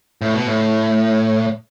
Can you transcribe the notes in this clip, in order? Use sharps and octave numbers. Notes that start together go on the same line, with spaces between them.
A2
B2
A2